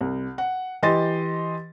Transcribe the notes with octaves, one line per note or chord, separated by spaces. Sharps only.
C2
F#5
E3 G4 D#5 C6 A6